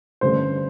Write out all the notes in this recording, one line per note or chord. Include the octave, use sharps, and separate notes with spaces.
A1 G2 D3 A3 C5